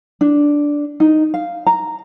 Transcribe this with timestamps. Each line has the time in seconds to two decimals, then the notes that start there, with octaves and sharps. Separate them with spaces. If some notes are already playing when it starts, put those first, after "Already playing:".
0.21 D4
1.00 D#4
1.34 F5
1.67 A#5